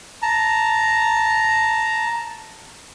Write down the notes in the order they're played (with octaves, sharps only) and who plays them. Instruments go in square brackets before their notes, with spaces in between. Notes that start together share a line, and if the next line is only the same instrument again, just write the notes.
[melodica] A5 A#5